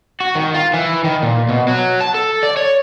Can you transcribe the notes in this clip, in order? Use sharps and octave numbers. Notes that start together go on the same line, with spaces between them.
F#4
D#3
F4
E3
D#3
A#2
B2
F#3
A5
A4
D5
C#5